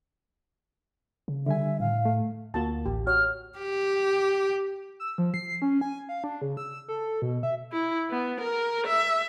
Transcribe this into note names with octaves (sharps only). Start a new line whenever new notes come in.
C#3
D3 G3 E5 G#5
A2 F5
A3
D2 A#3 F4 F#4 A5
A1 G4
F#4 C#5 F6
G4
E6
F3
C7
C#4
G#5
F5
D4
C#3
E6
A4
B2
E5
E4
B3
A#4
E5